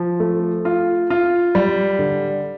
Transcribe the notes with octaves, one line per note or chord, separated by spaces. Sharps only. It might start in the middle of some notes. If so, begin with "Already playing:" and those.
Already playing: F3
A3
F4
F4
G3
D3